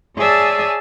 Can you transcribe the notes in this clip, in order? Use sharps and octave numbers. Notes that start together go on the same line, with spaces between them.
G#4 C#5 D5 E5 G#5 A5